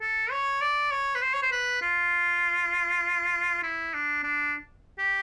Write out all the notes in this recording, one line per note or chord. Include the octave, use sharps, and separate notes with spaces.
A4
C#5
D5
C#5
B4
C5
C#5
C5
B4
F4
E4
D4
D4
G4